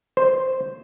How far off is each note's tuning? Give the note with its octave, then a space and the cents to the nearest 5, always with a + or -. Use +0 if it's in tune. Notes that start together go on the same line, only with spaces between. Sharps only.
C5 +0